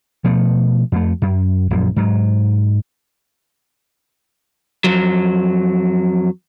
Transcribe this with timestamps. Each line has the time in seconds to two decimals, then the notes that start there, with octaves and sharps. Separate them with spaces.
0.24 B2 F3 A3
0.92 F2 A3
1.22 F#2
1.71 A#1 F#2
1.96 G#2 F#3
4.84 F2 F#3